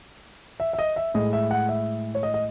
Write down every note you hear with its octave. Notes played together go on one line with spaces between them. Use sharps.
E5
E5
D#5
E5
A2 G#3 D#5
E5
F#5
E5
C#5
D#5
D#5